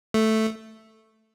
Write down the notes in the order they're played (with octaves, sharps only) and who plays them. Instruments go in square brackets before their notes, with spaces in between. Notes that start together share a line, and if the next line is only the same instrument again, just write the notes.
[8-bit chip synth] A3